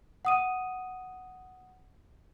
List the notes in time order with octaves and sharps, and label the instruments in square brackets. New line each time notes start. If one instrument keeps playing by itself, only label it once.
[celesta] F#5 D#6 D#7